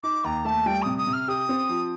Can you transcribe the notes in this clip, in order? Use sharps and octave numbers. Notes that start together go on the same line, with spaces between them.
D#4 D6
D#2 A#5
A3 A5
G3 G5
C3 D#6
D#6
C3
F6
G4 D#6
C4
F3